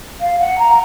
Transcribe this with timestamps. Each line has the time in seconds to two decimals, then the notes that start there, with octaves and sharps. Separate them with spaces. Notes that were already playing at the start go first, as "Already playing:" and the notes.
0.20 F5
0.39 F#5
0.58 A#5